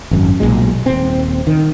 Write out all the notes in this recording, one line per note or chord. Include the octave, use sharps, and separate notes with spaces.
G#1 F#2
B1 E2 A#2 G#3
D#1 C4
D#3